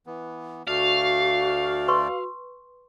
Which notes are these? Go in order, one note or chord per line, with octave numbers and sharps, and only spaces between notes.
E3 B3
D2 A3 F#4 D5 F5
B4 C6 C#6